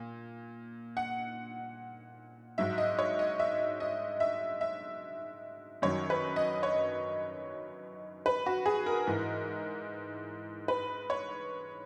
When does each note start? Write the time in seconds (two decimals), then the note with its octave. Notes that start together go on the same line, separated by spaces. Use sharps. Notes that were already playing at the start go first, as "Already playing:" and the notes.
Already playing: A#2
0.97 F#5
2.58 G#2 F#3 E5
2.78 D#5
2.99 C#5
3.19 D#5
3.40 E5
3.80 D#5
4.20 E5
4.61 E5
5.82 F#2 D#3 F#3 C#5
6.10 B4
6.36 D#5
6.63 C#5
8.26 B4
8.46 F#4
8.66 G#4
8.86 A#4
9.07 G#2 E3
10.68 B4
11.10 C#5